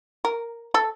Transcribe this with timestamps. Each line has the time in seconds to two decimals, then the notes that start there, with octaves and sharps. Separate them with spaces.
0.25 A#4
0.74 A4